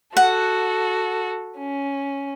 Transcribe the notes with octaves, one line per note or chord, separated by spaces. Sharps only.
F#4 A4 F#5
C#4